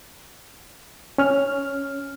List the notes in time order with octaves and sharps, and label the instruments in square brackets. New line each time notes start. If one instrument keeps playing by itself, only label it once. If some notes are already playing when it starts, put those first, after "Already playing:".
[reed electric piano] C#4 F6